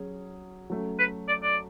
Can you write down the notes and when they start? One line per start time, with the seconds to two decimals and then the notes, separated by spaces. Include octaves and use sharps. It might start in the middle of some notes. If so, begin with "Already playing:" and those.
Already playing: F#3 C#4 G#4
0.70 F#3 A3 C#4
0.99 B4
1.28 D5
1.43 D5